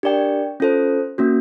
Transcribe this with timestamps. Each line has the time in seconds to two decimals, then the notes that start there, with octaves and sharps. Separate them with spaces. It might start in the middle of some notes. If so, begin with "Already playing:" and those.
0.03 D4 G4 A#4 D5 G5
0.60 C#4 F4 A4 C5
1.18 A#3 C#4 F#4